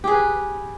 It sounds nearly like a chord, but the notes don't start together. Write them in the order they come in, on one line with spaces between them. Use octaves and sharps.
G4 G#4 B4